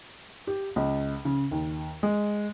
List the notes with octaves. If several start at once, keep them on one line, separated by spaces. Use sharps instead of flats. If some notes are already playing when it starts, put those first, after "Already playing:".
G4
C#2
C#3
D#2
G#3